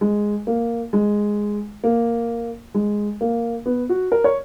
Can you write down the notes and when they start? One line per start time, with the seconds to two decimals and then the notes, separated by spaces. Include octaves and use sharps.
0.01 G#3
0.47 A#3
0.93 G#3
1.84 A#3
2.74 G#3
3.21 A#3
3.66 B3
3.89 F#4
4.12 A#4
4.24 C#5